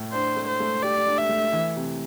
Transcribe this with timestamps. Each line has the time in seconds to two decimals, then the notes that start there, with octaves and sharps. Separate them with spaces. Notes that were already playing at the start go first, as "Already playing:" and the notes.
Already playing: A2
0.13 D4 C5
0.36 A3
0.48 C5
0.60 A3
0.82 G4 D5
1.06 D4
1.18 E5
1.29 A3
1.53 E3
1.76 C3